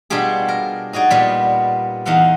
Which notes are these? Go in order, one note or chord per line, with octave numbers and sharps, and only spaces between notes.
B2 G3 D4 F4 G4 G#4
A#4
D#4 F#4 G#4 D5
A#2 G3 B3
E2 D#4 F5 F#5 C6